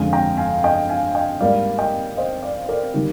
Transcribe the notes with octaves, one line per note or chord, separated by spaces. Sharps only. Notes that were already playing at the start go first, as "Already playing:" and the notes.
Already playing: F2 D3 G#3 F5 G#5
G5 A#5
F5 G#5
D#5 G5
F5 G#5
D#5 G5
G#2 G3 A#3 D5 F5
D#5 G5
C5 D#5
D5 F5
A#4 D5
D#3 G3 A#3